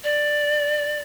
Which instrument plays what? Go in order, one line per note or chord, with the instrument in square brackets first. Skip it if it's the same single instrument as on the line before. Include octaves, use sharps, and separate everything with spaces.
[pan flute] D5